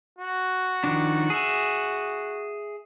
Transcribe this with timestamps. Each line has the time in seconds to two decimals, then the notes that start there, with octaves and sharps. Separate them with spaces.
0.18 F#4
0.84 D#3 F3 D4
1.30 G#4 E5